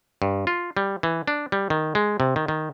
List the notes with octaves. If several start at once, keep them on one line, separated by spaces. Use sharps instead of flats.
G2
F4
G3
E3
D4
G3
D#3
G#3
C3
D#3
D#3